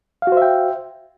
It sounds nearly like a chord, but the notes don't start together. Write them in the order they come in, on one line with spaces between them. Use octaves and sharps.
F5 F#4 C5 E5 G5